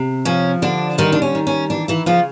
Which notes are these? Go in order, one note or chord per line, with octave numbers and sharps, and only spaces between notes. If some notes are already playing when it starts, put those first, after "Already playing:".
Already playing: C3
F3 C#4
D3 D4
D#3 G3 D#4
D4
C#4
D#3
C#4
E3 D4
E3 E4
C#3 F3 F4